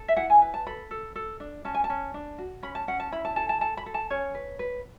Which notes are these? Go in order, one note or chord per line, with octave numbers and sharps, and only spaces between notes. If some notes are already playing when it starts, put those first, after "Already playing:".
Already playing: A4
E5
E4 F#5
G#5
B4
A5
A4 B5
A4
A4
D4
C#4 A5
G#5
A5
C#4
D4
F#4
C#4 B5
A5
C#4 F#5
A5
E4 B5
A5
A4 A5
A5
A4 A5
B5
A4
A5
C#4 C#5
B4
B4